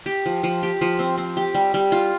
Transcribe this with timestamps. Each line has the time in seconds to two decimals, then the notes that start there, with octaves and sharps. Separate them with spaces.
0.06 G4
0.26 F3
0.43 F3
0.63 G4
0.81 F3
0.99 C4
1.18 C4
1.37 G4
1.55 G3
1.74 G3
1.92 F4